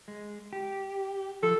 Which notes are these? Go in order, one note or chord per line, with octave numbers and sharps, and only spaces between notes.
G#3
G4
F3 A4